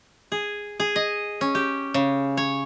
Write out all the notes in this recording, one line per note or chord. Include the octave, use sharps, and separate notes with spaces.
G#4
G#4
D#5
C#4
G4
C#3
C#5